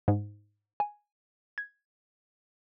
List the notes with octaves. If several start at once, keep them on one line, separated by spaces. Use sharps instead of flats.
G#2
G#5
G#6